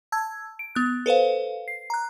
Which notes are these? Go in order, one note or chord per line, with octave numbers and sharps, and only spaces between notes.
A5 E6 G#6
D7
B3 F#6
A4 B4 C5 F5
C7
A#5 F#6